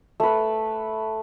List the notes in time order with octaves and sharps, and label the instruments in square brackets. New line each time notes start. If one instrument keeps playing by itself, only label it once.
[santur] A3 B4